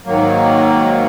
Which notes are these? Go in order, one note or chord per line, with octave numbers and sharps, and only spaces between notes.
G#2 D#3 F#3 A#3